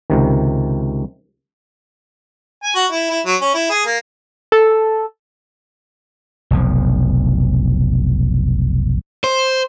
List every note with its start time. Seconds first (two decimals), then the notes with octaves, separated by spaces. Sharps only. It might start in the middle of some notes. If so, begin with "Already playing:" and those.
0.10 C#2 C3 D#3
2.64 G#5
2.75 F#4
2.91 E4
3.10 E4
3.26 F#3
3.42 C#4
3.54 E4
3.70 G#4
3.86 A#3
4.52 A4
6.51 F1 B1 F3
9.24 C5